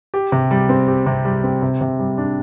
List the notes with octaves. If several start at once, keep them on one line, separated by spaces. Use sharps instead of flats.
G4
C3
G3
C4
G4
C3
G3
C4
C3
C3
G3
D4